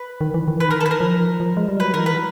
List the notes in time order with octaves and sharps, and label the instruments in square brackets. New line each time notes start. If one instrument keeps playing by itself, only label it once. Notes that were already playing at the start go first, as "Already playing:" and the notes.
Already playing: [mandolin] B4
[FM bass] D#3
E3
D#3
E3
[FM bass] D#3 [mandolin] B4
[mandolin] A#4
A4
B4
A#4
[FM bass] F3
F3
G#3
G3
[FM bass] F#3 [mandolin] B4
[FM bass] D#3 [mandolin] A#4
[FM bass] E3
[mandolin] B4